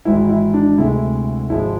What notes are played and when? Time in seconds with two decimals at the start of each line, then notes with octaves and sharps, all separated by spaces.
0.05 G#1 G#2 E3 E4
0.29 E4
0.54 D4
0.78 D2 C3 G#3 E4
1.49 G#1 G#2 F3 G#3 E4